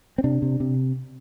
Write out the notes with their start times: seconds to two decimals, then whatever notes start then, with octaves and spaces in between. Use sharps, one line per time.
0.18 C4
0.24 C3 D4
0.42 C3
0.60 C3